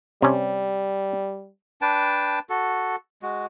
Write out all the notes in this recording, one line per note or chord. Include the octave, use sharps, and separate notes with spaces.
C3 G3 C#4
D4 B4 G5 A5
F#4 A4
G#3 F#4